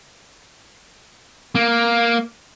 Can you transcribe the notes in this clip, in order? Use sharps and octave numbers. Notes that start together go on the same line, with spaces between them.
A#3